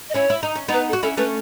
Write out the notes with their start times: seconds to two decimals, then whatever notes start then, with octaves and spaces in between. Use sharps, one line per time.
0.10 D#5
0.14 C#4 E4 C#5
0.30 E4
0.43 D#4
0.55 C#4
0.68 B3 D#4 B4
0.89 A4
0.93 F#4
1.03 C#4 E4 A4
1.17 A3 C#4 B4